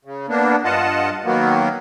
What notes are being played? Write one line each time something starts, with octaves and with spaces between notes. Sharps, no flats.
C#3
A#3 B3 D4
G2 F4 D#5 F#5 A5
D#3 F#3 A#3 B3